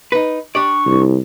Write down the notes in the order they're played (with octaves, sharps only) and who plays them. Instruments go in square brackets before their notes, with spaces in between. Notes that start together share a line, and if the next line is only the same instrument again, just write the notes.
[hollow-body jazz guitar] D#4 B4
[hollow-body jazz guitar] D4 G4 D5 [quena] C#6
[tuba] C2